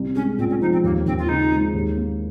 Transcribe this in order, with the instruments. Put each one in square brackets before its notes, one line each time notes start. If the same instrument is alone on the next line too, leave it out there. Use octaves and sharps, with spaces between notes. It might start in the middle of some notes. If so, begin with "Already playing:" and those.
Already playing: [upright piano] C2
[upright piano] G#3 [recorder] C#4
[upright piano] A#2 [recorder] C4
[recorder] C#4
[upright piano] F3 [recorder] D#4
[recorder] C4
[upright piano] D#2 [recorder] A#3
[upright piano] D#2 [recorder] C4
[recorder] F4
[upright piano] C#3 [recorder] D#4
[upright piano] G#3
D#2
A#3